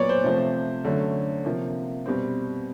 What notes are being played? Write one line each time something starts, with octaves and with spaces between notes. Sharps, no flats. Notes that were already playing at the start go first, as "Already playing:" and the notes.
Already playing: A#2 F#3 B3 C#5 D5
C5
C3 F3 A3 C4
D3 F#3 A3 C#4
C3 F3 A#3
B2 G3 C4